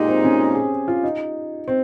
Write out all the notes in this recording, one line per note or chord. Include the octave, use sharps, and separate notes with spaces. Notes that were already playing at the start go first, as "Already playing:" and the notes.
Already playing: A#2 G#3 D#4 G4
C4
C#4
G#4
F4
D#4
C4